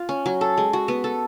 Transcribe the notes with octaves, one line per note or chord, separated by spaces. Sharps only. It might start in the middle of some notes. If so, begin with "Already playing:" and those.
Already playing: F4
C#4
F#3
A4
G#3
F#4
B3
A4